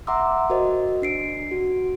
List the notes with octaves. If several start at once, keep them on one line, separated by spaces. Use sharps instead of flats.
E5 F#5 A#5 C6 D6 E6
F#4 A#4 C5 D#5
D4 C7 D7
F#4